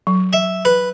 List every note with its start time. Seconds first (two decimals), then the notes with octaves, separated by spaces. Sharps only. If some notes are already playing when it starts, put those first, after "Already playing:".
0.07 F#3
0.33 E5
0.65 B4